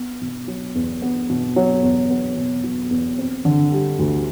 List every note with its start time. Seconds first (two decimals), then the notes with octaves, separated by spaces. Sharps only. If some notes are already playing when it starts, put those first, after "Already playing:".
Already playing: B3
0.21 B2
0.48 F#3
0.75 E2
1.02 B3
1.30 B2
1.56 F#3
1.82 E2
2.10 B3
2.36 B2
2.64 F#3
2.90 E2
3.18 C4
3.45 D3
3.72 G3
3.99 D2